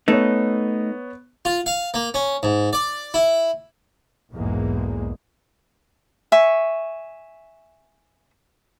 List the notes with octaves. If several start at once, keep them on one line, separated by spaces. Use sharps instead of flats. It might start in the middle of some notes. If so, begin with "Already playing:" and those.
A3 B3 D#4 C#5
F4
F5
A#3
C#4
G#2
D5
E4
B1 E2 G#2 D3 G#3 A#3
E5 G#5 C#6